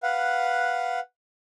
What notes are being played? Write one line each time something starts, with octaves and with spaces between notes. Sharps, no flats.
B4 F5 F#5